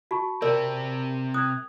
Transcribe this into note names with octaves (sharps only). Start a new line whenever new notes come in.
F#4 A5 B5 C#6
C3 C4 A#4 D5
D#6 F#6 G#6